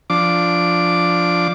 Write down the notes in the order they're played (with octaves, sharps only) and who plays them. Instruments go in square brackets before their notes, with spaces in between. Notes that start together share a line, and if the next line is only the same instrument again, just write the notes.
[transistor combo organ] F3 D4 D6